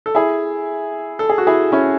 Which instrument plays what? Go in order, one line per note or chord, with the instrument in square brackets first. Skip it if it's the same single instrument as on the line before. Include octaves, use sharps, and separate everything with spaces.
[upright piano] A4
E4 G#4
A4
G#4
F#4
E4 G#4
C#4 E4